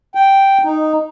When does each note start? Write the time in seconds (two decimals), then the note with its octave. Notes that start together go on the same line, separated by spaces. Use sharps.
0.15 G5
0.64 D#4